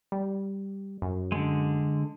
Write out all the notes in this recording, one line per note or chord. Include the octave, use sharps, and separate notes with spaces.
G3
F#2
D3 G#3